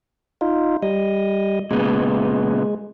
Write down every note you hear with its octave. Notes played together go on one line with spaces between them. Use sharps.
D#4 F4
G3 D#5
A#2 C#3 G#3 B3